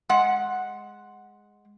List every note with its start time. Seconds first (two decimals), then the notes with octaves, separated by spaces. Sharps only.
0.09 G#3 F#5